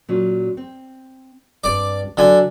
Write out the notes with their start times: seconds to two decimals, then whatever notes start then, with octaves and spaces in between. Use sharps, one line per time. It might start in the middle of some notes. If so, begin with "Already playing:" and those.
0.09 A#2 F#3 C#4
0.57 C4
1.64 G2 C4 D5 D6
2.17 D3 F#3 G#5